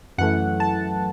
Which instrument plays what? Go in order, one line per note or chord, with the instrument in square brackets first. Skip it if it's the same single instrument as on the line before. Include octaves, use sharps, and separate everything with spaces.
[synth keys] F#2 E3 A3 F#5
A5